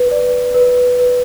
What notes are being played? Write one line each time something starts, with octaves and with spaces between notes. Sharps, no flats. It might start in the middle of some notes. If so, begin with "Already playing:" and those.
Already playing: B4
D5
B4
B4